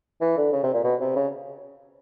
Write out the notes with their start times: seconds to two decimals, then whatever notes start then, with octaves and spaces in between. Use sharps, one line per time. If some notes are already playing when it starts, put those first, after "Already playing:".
0.21 E3
0.37 D3
0.52 C#3
0.63 C3
0.74 A#2
0.84 B2
1.00 C3
1.16 C#3